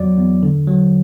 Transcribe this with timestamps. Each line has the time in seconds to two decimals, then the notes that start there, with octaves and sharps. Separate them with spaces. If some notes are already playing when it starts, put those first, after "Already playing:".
Already playing: E2 F#3 D5
0.17 E2
0.43 D3
0.68 F#3